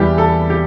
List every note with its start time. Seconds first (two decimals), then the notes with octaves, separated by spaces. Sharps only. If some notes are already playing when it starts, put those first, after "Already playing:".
Already playing: E2 E3 G3 G4
0.18 A4
0.50 G4